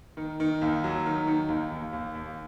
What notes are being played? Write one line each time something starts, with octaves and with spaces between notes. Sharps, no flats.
D#3
D#3
D#2
F#3
D#3
D#3
D#2
D#2
D#2
D#2